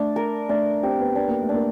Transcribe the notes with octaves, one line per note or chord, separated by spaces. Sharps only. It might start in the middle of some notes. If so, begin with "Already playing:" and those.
Already playing: A3 D4
A#4
A3 D4
C4 G4
B3
B3 D4
A#3
A3
D4
A#3